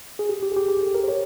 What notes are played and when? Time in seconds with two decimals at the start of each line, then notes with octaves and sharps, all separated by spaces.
0.19 G#4
0.29 G4
0.42 G4
0.52 G#4
0.56 G4
0.68 G4
0.81 A4
0.95 A#4
1.04 C5
1.08 C#5